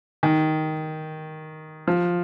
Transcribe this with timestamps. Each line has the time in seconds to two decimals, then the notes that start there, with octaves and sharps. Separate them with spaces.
0.23 D#3
1.88 F3